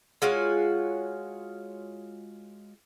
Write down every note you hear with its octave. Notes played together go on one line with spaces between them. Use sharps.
G#3 F4 F#4 C#5